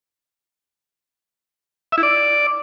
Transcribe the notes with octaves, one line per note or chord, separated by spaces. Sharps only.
E5
E4
D5